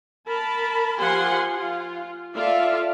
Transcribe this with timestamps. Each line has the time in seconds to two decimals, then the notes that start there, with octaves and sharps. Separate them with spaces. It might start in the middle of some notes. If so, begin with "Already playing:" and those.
0.27 A#4 A5 B5
0.99 F3 G4 F5 F#5 G#5 C6
1.56 F4
2.35 F4 A4 D5 E5